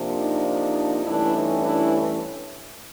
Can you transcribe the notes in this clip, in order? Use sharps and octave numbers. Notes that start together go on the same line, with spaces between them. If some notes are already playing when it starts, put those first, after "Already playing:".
Already playing: C3 F3 A#3 D4
D#4
D#4
G2 E3 A3 C#4 D4 E4
D#4
D4 E4